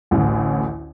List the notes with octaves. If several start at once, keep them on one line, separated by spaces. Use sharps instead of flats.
A1 D2 A2